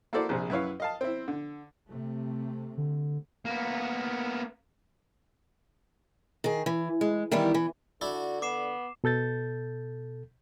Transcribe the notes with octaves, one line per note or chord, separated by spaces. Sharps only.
A#3 E4 F#4 A4 C5 D5
A#1 C3 G#4 C5
F#2 E4 B4 C#5 F5
D#5 F5 A5
C4 E4
D3
C3 A3
D3
A#3 B3
D#3 G#4
E3
G#3
D#3 E3 G3 B3 E4
E3
D3 D4 E4 F#4
B3 D6 C7 E7
B2 A4 G6 A6